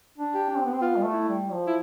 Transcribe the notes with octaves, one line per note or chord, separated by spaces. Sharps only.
D4
G4
D4
C4
B3
C4
B3 F4
G3
A3
E4
G3
F3
E4